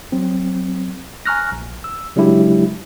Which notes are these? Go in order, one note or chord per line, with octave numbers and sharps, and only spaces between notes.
F#3 C4
G#5 A#5 C#6 F6 F#6 A#6
A#1
E6
C#3 F#3 G#3 D4 E4 G4